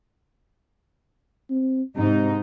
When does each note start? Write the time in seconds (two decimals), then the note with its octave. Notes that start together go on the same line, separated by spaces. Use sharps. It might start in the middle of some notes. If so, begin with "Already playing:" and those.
1.50 C4
1.97 G#2 C3 D#4